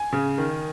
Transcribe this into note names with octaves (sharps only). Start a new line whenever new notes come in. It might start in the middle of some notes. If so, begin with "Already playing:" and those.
Already playing: G#5
C#3
D#3